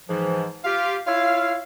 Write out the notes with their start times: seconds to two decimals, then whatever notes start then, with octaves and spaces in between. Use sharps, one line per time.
0.09 G#2 E3 F3
0.65 F4 G4 F5
1.06 E4 F4 C#5 F5